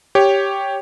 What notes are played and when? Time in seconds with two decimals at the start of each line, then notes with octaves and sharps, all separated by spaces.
0.15 G4 C#5